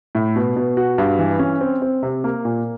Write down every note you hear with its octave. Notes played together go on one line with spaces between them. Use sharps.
A2
B2
B2
F#4
G2
E3
C#4
C4
C4
C3
A#3
A#2